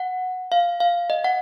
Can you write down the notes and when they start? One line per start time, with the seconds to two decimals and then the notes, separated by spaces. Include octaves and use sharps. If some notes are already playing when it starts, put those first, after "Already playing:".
Already playing: F#5
0.52 F5
0.80 F5
1.10 D#5
1.24 F#5